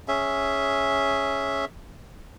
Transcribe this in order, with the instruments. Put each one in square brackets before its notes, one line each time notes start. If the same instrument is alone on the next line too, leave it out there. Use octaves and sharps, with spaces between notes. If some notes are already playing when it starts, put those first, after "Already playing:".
[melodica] C#4 G#4 E5